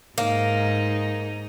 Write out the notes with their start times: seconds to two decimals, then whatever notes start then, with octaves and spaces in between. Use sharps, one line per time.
0.18 G#2 A#3 D#4